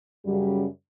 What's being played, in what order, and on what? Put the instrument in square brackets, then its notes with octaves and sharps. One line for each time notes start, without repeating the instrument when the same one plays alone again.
[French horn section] F#2 C#3 G3